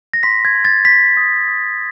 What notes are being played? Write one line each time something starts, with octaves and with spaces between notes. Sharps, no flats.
A#6
C6 B6
G#6
C6
A6
C6 B6
D#6
D#6